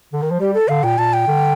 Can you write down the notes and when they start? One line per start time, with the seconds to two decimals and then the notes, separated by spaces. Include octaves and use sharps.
0.13 D3
0.22 D#3
0.31 F3
0.40 G3 G4
0.54 A4
0.68 D3 F5
0.83 A#2 G5
0.98 A#2 A5
1.13 G5
1.27 D3